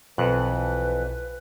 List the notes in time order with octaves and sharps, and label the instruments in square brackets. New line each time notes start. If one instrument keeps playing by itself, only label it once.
[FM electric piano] B1 F#6 [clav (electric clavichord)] F2 [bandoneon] E3 [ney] B4